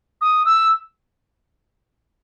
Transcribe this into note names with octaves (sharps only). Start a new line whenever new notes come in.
D#6
E6